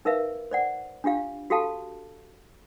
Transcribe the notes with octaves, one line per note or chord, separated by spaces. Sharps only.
D#4 A#4 B4 E5 F5
C5 D5 F#5
D4 F4 G4 F5
F#4 G4 A4 F5 A5